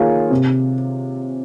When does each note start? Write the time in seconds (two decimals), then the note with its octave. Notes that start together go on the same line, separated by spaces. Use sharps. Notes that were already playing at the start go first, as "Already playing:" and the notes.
Already playing: D#3 A#3 F4 G#4 C#5
0.30 C3